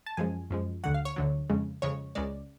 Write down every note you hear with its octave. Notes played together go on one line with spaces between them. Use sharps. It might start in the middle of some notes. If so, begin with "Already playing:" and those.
A5
F#2 F3 G#3 G#5
F#2 F3 G#3
D2 D3 F#3 F#5
F5
C#5
D2 D3 F#3
F2 C#3 G#3
F2 C#3 G#3 C#5
C#2 C#3 G#3 D5